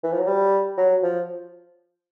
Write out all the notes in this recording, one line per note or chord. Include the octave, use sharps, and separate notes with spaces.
E3
F3
F#3
G3
F#3
F3